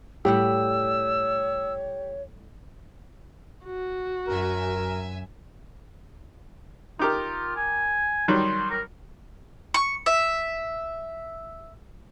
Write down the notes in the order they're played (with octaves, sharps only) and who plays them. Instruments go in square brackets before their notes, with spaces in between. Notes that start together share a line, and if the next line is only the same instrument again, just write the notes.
[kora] A2 G3 F#5 [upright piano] G4 [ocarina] C#5 [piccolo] E6
[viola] F#4
[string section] F#2 E5 G#5 [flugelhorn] A#4
[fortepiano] D#4 G4 A#4 [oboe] F4
[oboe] G#5
[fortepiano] D#3 F#3 G3 [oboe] C6
[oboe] A#4
[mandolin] C#6
E5